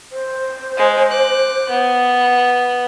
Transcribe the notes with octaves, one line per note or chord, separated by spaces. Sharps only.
C5
G#3
D6 F#6
B3